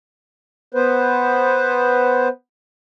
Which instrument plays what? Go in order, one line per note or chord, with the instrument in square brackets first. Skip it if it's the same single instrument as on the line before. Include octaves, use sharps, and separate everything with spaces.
[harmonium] B3 B4 C5